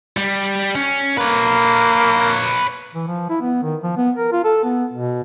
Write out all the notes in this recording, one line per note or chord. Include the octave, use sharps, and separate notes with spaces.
G3
C#4
A#3 B4 C#5
E3
F3
E4
B3
D#3
F3
B3
A#4
F4
A4
B3
B2